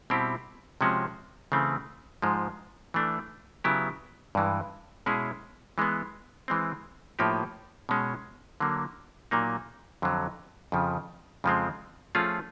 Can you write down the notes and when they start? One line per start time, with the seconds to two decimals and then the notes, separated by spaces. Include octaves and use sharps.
0.10 B2 G3 C4 E4 G4
0.81 C3 F3 G#3 C#4 F#4
1.52 C#3 E3 A3 C4
2.22 G#2 F3 G#3
2.94 E3 A3 D4
3.64 C#3 F#3 B3 E4 G4
4.35 G2 E3 G#3
5.06 B2 G#3 C#4 E4 G#4
5.78 E3 G#3 B3
6.48 E3 G#3 C4
7.19 A2 F3 A#3 D#4 G4
7.89 B2 G#3 C#4
8.60 D3 F#3 A#3
9.31 A#2 F#3 A#3 D#4
10.02 F2 D3 F#3
10.72 F2 C#3 F3
11.44 F2 C#3 F3 G#3 C4
12.15 F3 A3 C#4 F4 G#4